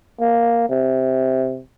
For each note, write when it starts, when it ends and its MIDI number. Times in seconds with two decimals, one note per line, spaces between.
0.21 0.68 58
0.69 1.60 48